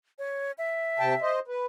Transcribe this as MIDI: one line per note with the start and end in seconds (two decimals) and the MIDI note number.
0.19 0.52 73
0.58 1.31 76
0.99 1.14 48
0.99 1.14 79
0.99 1.14 81
1.22 1.39 72
1.22 1.39 75
1.48 1.66 71